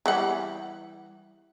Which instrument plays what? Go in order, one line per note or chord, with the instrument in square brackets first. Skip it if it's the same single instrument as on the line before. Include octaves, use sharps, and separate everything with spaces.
[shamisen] E3 G3 F#5